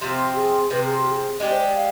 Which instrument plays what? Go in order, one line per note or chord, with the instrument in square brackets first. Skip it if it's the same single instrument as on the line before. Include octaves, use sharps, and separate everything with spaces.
[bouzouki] C3 F3 C4 [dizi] G4
[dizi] G#4
[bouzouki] C3 F3 C4 [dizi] B4
[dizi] G#4
G4
G#4
[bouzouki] G#3 D4 G4 [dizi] D5
[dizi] C5
D5
F5